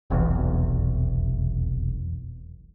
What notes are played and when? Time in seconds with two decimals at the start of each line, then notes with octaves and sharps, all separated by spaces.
0.10 F1 B1 E2